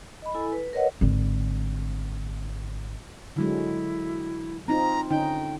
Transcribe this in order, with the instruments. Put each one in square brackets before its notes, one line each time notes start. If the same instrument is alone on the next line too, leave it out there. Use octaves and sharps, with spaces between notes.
[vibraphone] D#5 B5
E4 A4 G#5
B4
A#4 B4 C#5 D#5 F#5
[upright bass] G#1 D3
[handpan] D3 F#3 G#3 [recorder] E4
[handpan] C4 D#4 F4 [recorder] A#5
[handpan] D3 C#4 D#4 [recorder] G5